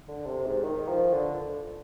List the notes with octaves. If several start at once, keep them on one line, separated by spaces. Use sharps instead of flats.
D3
C3
G#2
D#3
F3
D3